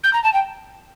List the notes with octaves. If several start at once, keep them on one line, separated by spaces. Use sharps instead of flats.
G6
A#5
A5
G5